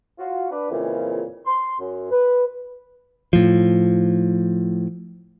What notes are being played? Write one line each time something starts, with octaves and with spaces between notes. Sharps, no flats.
F4 F#4
D4 B4
F2 A#2 C#3 E3
C6
F#2
B4
A2 F3